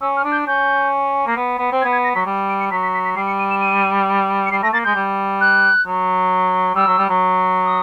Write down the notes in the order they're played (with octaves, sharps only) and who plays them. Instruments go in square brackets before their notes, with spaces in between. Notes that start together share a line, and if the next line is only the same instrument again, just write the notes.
[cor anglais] C#4 [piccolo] E6
[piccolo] F6
[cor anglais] D4
[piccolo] G6
[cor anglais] C#4 [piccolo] G6
[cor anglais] A#3
B3
B3
C4
[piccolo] G#6
[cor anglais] B3
[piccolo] G#6
A#6
[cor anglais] F#3 [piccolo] B6
[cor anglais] G3
[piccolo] D7
C#7
[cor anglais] F#3 [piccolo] B6
[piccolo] B6
B6
B6
[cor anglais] G3 [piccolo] C7
[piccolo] C#7
D#7
E7
D#7
C#7
[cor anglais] G3 [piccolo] C7
[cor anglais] A3 [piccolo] A#6
[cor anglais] A#3 [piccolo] A6
[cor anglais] G#3 [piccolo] G6
[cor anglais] G3
[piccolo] F#6
[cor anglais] F#3
[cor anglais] G3 [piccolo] E6
[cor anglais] F#3
G3
F#3
[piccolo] D#6